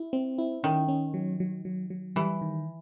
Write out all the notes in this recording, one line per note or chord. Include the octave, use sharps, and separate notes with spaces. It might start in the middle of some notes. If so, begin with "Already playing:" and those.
Already playing: E4
C4
E4
D#3 C#4
C#4
F#3
F#3
F#3
F#3
E3 G3
D#3